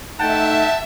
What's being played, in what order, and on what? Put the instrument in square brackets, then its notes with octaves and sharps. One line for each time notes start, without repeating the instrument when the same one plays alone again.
[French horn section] A3 D#4 [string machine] E5 [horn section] F#5 G5 A5